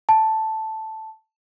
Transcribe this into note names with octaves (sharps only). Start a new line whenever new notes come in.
A5